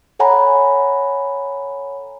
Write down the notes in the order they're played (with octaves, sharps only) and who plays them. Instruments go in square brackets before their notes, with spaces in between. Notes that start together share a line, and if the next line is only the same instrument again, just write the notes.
[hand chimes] A4 C#5 F#5 G#5 A#5 B5